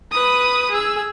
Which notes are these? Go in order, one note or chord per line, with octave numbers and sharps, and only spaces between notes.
B4 D#6
G#4 E6